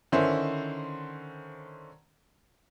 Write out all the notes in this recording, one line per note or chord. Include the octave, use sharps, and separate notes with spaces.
D3 D#3 C#4 E4 C5